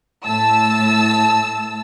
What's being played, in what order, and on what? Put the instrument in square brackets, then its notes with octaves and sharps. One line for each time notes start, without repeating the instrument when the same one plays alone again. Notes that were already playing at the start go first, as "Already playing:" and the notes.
[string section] A2 A5 E6